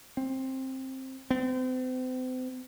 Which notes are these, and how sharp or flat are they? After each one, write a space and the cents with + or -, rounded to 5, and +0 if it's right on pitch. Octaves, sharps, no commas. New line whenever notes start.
C4 +15
C4 -40